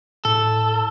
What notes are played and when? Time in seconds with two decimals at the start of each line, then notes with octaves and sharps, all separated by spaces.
0.25 A2 A4